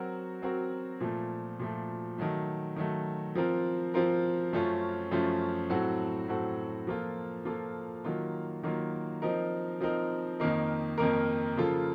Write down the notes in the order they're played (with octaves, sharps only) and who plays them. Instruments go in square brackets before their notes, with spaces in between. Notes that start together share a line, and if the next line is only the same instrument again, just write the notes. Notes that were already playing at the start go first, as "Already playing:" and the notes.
Already playing: [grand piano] F#3 C4 F#4 A#4
F#3 C4 F#4 A#4
A#2 F3 A3
A#2 F3 A3
D#3 F#3 A3
D#3 F#3 A3
F3 C4 F4 A#4
F3 C4 F4 A#4
F#2 F3 A3 C#4 F4
F#2 F3 A3 C#4 F4
A2 F#3 C4 F#4 A4
A2 F#3 C4 F#4 A4
F3 A#3 F4 A4
F3 A#3 F4 A4
D#3 F#3 A#3 F4
D#3 F#3 A#3 F4
F3 C4 D#4 A#4
F3 C4 D#4 A#4
F2 D#3 A#3 D#4 A#4
F2 D#3 A#3 D#4 A#4
C#3 F3 A#3 F4 A4